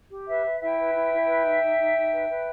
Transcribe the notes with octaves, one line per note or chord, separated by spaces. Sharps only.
G4
B4 E5
B4
E4 E5 G5
B4
E4
E4
B4
D#4
D#4
D#4
D#4
B4
B4